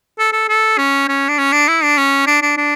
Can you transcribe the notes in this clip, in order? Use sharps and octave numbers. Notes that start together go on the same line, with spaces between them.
A4
A4
A4
C#4
C#4
D4
C#4
D4
E4
D4
C#4
D4
D4
D4